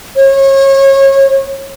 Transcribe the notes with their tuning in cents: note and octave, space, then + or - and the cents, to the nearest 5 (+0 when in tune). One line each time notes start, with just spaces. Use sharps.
C#5 -30